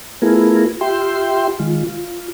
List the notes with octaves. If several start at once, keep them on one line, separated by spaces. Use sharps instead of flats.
A3 B3 E4 F4 G#4 A#4
F4 G4 E5 G5 C6
D#3 G#3 F4
F4